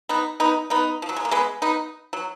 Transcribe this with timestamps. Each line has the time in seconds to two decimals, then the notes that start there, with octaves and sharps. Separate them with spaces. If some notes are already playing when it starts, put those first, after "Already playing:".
0.09 B3 D#4
0.40 B3 D#4
0.70 B3 D#4
1.02 F3
1.09 F#3
1.16 G#3
1.25 A#3
1.31 G#3 B3
1.62 B3 D#4
2.13 F#3